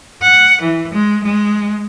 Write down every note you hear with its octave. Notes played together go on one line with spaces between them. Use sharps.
F#5
E3
G#3
G#3